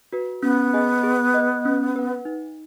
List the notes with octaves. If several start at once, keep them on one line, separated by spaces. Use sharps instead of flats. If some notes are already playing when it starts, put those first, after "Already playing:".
F#4 B4
B3 C#4
G#4 D#5 G#5
G#4
B4 D#5
C#4
B4 F#5
D#4